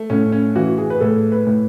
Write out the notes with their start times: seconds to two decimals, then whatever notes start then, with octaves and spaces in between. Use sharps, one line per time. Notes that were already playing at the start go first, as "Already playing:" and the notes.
Already playing: A3
0.10 A2 C#4
0.32 C#4
0.56 E3 F#4
0.78 G#4
0.90 B4
1.01 A2 A4
1.32 B4
1.47 A2